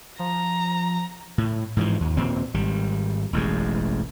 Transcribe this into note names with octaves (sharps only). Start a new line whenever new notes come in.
F3 A#5
A2
G#2 E3 F3
D#2
D#2 A#2 C4
G#1 G3
E1 A1 F#2 G#3